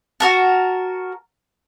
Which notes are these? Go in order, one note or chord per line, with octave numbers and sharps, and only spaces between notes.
F#4 A#4 A5